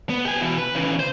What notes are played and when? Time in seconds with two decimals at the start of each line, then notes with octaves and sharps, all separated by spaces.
0.10 B3
0.25 G4 G#5
0.41 B2 E3
0.58 B4
0.75 C#3 E3
1.00 C5